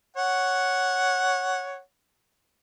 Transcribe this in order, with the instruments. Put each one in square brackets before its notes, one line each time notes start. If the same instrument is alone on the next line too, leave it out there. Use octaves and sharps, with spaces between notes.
[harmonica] C#5 F#5